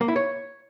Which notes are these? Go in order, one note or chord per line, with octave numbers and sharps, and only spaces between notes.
A#3
E4
C#5